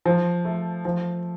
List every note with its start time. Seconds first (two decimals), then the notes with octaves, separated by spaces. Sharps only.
0.06 F3
0.45 A3
0.85 F3